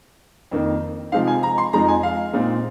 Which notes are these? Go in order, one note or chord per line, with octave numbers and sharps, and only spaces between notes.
F2 D#3 A#3
C3 F3 G#3 C4 D#4 F5
G#5
A#5
C6
F2 F3 G#3 D#4 A#5
G#5
F5
A#2 G#3 C4 D#4